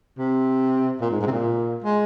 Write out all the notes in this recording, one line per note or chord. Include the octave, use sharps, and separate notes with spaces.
C3
A#2
G#2
G#2
C3
A#2
G#3